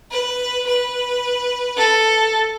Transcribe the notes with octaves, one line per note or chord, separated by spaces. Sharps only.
B4
B4
A4